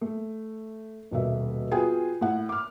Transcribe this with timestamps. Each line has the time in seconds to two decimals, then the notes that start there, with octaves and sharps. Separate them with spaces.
0.01 A3
1.11 D#1 B2 A#3 E5
1.71 B3 F4 F#4 G#4 G5 G#5
2.21 A2 F#5
2.49 D6 F6